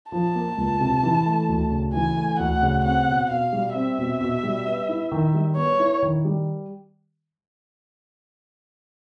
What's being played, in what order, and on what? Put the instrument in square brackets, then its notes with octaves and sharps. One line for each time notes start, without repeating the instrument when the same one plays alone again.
[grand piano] F3 [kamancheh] A5
[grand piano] A#3
C#2
C3
E3
A3
D2
C#3
[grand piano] E3 [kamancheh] G#5
[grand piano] A3
[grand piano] D2 [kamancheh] F#5
[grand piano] C#3
[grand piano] C4 [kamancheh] F#5
[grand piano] B2
[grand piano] B2 [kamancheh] F5
[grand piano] G3
[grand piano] C4 [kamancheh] E5
[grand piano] B2
B2
G3
B3
E4
D#3
G3
[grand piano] B3 [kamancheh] C#5
[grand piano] E4
D#3
G3